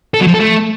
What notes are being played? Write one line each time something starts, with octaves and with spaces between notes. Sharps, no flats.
A4
F#3
F3
A4
A3